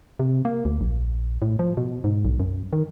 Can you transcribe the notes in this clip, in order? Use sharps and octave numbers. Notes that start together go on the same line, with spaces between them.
C3
A#3
D2
A#1
A2
F3
B2
G#2
B1
F#2
D#3